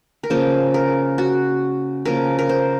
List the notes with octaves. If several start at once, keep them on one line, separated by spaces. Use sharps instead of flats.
A#4
C#3 F3 A#3 C5
A#4
F#4
C#3 F3 A#3 A#4
A#4
C5